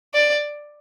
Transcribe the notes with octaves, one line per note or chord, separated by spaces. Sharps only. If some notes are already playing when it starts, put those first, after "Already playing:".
D5